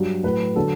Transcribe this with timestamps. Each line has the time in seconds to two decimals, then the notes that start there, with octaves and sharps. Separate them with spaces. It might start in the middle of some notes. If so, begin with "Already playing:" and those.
Already playing: G2 F#3
0.23 A2 F#3 B4
0.56 D3 F#3 A4